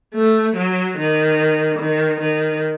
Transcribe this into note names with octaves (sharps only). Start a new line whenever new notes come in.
A3
F#3
D#3
D#3
D#3